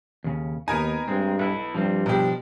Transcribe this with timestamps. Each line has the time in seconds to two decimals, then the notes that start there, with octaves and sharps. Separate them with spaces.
0.24 D#2 C#3
0.68 D#2 B3 D#4 A#4 G#5
1.08 G2 G#3 C4
1.39 B1 B3 E4
1.74 G2 F3 G3 C4
2.06 B2 F3 D4 G4